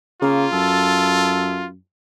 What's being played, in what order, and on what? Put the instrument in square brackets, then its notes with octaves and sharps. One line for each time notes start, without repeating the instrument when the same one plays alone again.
[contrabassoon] C#3 [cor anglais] A#3 [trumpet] F4
[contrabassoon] F#2 [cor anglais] A4